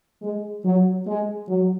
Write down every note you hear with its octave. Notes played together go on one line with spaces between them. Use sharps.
G#3
F#3
G#3
F#3